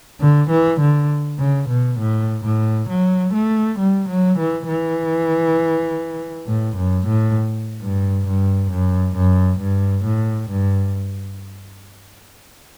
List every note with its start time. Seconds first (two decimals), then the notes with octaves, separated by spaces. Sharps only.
0.20 D3
0.50 E3
0.80 D3
1.39 C#3
1.69 B2
1.99 A2
2.44 A2
2.89 F#3
3.34 A3
3.79 G3
4.09 F#3
4.39 E3
4.68 E3
6.47 A2
6.77 F#2
7.07 A2
7.81 G2
8.27 G2
8.71 F#2
9.16 F#2
9.60 G2
10.05 A2
10.50 G2